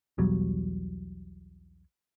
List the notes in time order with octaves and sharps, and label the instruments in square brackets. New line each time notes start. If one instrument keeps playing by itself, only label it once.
[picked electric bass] B1 E2 F#3 G3